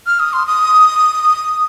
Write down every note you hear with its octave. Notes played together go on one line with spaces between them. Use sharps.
F6
D#6
C6
D#6